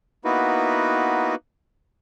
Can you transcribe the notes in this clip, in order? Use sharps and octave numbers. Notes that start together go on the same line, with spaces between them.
A#3 B3 D#4 E4 F#4 B4